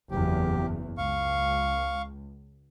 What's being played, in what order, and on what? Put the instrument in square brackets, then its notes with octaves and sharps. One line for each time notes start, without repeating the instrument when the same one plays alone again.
[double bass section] F#1 E2 [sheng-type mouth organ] G4
[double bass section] C#2 [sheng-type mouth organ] F5 C#6